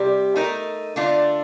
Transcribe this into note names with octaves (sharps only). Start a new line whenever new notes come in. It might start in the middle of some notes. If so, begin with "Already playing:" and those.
Already playing: C3 G3 G4 C5
A3 D#4 A#4
D3 A3 D4 F4